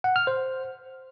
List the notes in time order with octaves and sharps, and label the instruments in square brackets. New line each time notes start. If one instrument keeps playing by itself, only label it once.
[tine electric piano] F#5
F6
C5